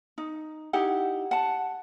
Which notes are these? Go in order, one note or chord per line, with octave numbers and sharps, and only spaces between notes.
D#4
D#4 E4 G4 F#5
F#5 A5